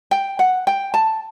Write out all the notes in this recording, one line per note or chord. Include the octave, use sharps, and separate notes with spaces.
G5
F#5
G5
A5